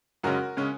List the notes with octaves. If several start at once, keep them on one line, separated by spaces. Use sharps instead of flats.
F#2 C#3 G#3 C#4 F#4 A#4
C#3 G#3 C#4